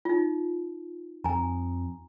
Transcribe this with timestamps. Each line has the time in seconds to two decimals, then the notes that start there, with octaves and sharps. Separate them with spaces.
0.05 D#4 F4
1.24 F2 G#5 A#5